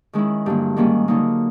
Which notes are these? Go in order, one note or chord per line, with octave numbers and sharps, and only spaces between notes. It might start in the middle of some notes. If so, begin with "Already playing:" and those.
D#3 G#3 C#4 E4
G2 D3 F#3 A#3
G#2 D#3 G3 A#3 C#4
D3 F#3 A#3 D#4